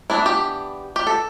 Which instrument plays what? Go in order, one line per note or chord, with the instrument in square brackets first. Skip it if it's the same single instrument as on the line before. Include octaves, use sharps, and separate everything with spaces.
[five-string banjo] E3 B3 D4 E4
G4
G4
A4